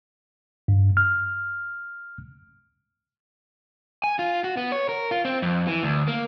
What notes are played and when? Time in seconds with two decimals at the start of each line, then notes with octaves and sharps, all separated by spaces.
0.68 G2
0.97 F6
4.04 G#5
4.19 F4
4.44 F#4
4.57 B3
4.72 C#5
4.89 A#4
5.11 F4
5.25 C4
5.42 F2
5.67 E3
5.83 D2
6.08 A#3